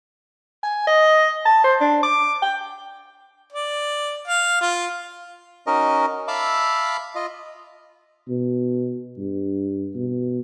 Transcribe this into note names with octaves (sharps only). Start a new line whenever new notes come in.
G#5
D#5
A5
C5
D4
D6
G5
D5
F5
F4
C#4 D#4 F#4 A#4 D#5
E5 F5 A5 B5 D6 E6
F4 D#5
B2
G2
B2